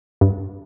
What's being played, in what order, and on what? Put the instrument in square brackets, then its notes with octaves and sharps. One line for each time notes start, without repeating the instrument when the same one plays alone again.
[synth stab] G2